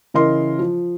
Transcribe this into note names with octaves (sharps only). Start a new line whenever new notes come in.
C#3 E3 A#4 D#5 C6
F3